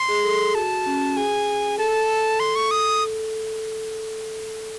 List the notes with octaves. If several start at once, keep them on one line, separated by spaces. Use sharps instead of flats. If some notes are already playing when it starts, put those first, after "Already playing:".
Already playing: C6
G#4
A4
G#4
F#4 A5
C#4
G#4 G#5
A4 A5
C6
C#6
D#6